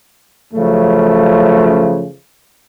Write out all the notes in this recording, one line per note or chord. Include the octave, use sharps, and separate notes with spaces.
F#2 C#3 F3 A3